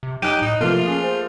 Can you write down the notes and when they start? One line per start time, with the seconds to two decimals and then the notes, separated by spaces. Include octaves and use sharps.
0.03 C3
0.22 F#3 D#4 G4 D#6 F#6 D#7
0.42 A2 D#4 D#5
0.61 C3 E3 F3 A3 A#3 F4
0.86 C#4 G#4
1.02 C5